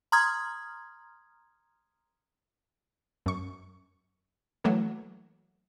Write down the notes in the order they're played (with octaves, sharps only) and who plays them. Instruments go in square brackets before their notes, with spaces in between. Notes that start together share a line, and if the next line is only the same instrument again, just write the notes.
[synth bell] A#5 C6 D#6 F6 G#6
[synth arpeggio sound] F#2 C#6
E3 F#3 A3 A#3